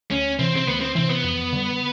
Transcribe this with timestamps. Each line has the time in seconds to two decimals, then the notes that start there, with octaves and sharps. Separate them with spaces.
0.11 D2 C#4
0.39 C3 E3 C4
0.56 C4
0.67 D2 B3
0.81 C4
0.95 C3 E3 C4
1.09 B3
1.24 F2
1.53 D3 G3